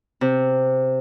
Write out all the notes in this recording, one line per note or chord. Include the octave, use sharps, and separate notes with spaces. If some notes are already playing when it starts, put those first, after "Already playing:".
C3